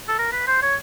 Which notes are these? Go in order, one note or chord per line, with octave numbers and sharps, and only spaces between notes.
A4
A#4
B4
C5
C#5